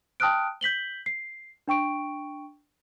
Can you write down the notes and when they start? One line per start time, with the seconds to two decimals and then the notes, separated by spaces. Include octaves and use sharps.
0.20 G5 A5 D#6 F6 F#6 D7
0.61 G6 B6 F#7 G7
1.06 C7
1.68 D4 G5 C#6 D7